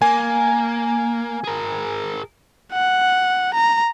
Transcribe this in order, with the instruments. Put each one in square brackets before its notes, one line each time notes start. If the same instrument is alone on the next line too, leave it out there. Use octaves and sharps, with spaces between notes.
[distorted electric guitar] A#3 [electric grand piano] G#5
[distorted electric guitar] G#4 A#4
[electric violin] F#5
A#5